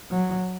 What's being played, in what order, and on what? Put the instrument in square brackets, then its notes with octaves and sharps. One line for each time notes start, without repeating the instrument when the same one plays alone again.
[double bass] F#3